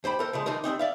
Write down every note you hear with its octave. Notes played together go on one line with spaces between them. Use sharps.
D#2 C5 G5 B5
A4 A#4 C5
C#3 F3 G#3
D3 E3 F3 D#4 A#4
G3 A3 C4 D#4
D5 E5 F5